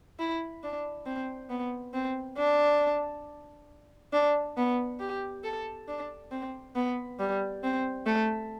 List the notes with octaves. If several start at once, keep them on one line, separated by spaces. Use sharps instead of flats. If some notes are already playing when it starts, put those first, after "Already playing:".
E4
D4
C4
B3
C4
D4
D4
B3
G4
A4
D4
C4
B3
G3
C4
A3